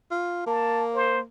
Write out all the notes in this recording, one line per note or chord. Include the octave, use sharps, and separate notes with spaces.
F4
A#3 A5
C5